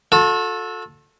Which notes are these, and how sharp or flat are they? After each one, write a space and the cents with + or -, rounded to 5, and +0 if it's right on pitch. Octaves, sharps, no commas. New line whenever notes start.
F#4 -45 A4 +0